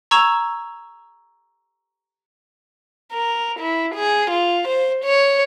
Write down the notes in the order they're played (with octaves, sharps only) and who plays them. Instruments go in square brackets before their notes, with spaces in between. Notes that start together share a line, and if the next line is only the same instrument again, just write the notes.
[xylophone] A#5 C#6 E6 G#6 E7 F7
[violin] A#4
E4
G#4
F4
C5
C#5